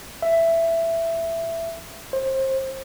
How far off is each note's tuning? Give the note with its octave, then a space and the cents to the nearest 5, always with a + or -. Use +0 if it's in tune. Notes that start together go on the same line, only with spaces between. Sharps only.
E5 +10
C5 +25